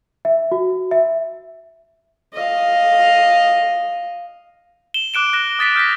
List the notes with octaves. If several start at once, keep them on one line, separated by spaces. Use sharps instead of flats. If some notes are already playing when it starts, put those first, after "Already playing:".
E5
F#4
E5
D#5 F5
E7 G7
D6 F#6 D7 E7
F#6 A#6 E7
D#6 A6 B6 D7
F6 G6 A#6 B6